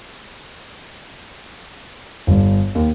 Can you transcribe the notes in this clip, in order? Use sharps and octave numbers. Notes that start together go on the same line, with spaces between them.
G1 G2
D#2